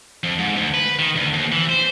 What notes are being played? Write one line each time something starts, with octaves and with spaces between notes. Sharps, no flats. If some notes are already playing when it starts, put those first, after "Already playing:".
F2
G#2
D2
B4
D#3
D2
D#2
E3
C5